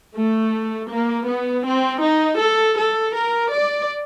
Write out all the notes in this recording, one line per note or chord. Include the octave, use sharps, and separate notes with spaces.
A3
A#3
B3
C4
D#4
A4
A4
A#4
D5